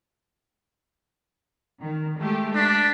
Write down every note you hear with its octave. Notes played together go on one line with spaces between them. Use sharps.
D#3
G#3 A3 G4
D4 B6